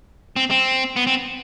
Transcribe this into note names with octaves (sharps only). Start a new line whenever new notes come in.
C4
C4
B3
C4